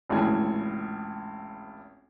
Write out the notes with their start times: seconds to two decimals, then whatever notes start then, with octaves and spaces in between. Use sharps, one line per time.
0.09 G#1 C#2 A2 E3 G#5